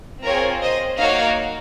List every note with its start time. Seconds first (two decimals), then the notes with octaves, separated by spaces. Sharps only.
0.25 C4 F4 G#4 A#4 C#5
0.63 C5 D#5
1.00 A#3 D#4 F#4 C#5 F5